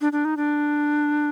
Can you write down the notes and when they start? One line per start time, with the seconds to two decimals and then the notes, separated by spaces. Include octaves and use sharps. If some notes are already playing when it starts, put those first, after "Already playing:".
0.01 D4
0.12 D4
0.25 D#4
0.37 D4